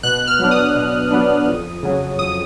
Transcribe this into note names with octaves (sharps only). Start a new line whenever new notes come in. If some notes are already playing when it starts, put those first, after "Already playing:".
B2 F#6
F6
F#3 B3 D4
D#6
B2
F#3 B3 D4
F2
C#3 F#3
F2 D#6